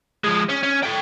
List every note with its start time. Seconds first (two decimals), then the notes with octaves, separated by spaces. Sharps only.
0.24 F3 G#3
0.49 C#4
0.63 C#4
0.83 A4 G5